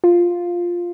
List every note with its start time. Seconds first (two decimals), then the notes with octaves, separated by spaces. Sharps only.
0.04 F4